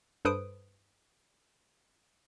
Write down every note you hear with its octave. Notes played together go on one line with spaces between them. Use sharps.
G2 A4 B4 C5 D#6 D7